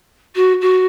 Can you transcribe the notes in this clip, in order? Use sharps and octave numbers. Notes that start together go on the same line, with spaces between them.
F#4
F#4